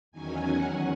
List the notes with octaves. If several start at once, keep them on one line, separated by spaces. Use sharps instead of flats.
E2 D#3 F#3 C#4 G#5
F#5